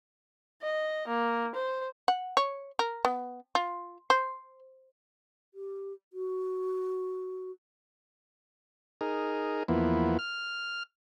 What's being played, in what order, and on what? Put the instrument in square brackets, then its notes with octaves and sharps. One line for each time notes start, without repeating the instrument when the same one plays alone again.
[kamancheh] D#5
A#3
C5
[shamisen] F#5
C#5
A#4
B3
F4
C5
[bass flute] G4
F#4
[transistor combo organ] D#4 G#4 A#4
E2 F3 A#3 B3 E4
F6